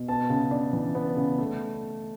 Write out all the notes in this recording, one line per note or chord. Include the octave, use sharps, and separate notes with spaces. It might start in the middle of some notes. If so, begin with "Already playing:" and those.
Already playing: B2
B3 A5
C#3
D4
E3
B3
C#3
A3